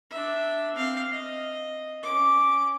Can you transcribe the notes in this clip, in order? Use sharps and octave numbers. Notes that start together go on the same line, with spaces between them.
D4 E5
C4 F5
D#5
C#4 D6